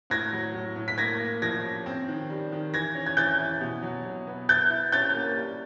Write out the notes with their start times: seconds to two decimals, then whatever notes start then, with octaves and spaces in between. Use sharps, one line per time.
0.10 A2 G#6 A#6
0.33 F#3
0.55 A2
0.76 A2
0.88 B6
0.98 A#3 G#6 A#6
1.20 A#3
1.42 F3 G#6 A#6
1.64 C#4
1.86 C4
2.09 D#3
2.30 G3
2.52 D#3
2.74 E3 G#6 A#6
2.95 C#4
3.06 G#6
3.17 E3 G6 A6
3.39 E4
3.61 B2
3.83 F#3
4.05 B2
4.27 B3
4.49 E4 G6 A6
4.70 E4
4.92 C#4 G6 A6
5.14 A#3
5.37 G3